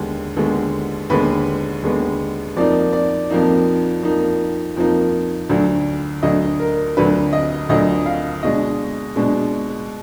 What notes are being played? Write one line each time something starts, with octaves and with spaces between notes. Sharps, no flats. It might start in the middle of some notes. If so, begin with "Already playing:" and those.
Already playing: D#2 D3 G#3 B3
D#2 D3 G#3 B3
D#2 D3 G#3 B3 B4
D#2 D3 G#3 B3
F2 F3 A#3 D#4 D5
D5
F2 F3 A#3 D#4
F2 F3 A#3 D#4
F2 F3 A#3 D#4
D2 D3 F#3 D4
D2 D3 F#3 D4 D#5
A#4
D2 D3 F#3 D4 B4
D#5
D2 D3 F#3 D4 D#5
F5
B2 G#3 D4 D#5
B2 G#3 D4